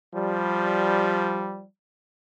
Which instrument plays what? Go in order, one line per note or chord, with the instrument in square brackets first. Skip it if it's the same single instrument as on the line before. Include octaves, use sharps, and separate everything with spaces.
[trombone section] F3 G3